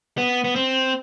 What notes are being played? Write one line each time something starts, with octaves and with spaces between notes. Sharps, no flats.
B3
B3
C4